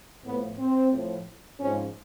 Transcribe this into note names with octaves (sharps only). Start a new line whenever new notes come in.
A2 F3 B3
C4
A2 F3
G#2 F3 C#4